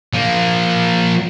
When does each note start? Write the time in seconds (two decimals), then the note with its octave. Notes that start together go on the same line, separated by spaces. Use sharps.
0.14 F3 A#3